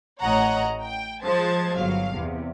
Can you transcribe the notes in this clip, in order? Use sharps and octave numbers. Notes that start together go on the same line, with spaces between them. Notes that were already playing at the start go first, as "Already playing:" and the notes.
A1 A2 C#5 D#5 F#5 A#5
G5
F3 G#3 C5 A5 G#6
G1 F#3 F5
E2 C3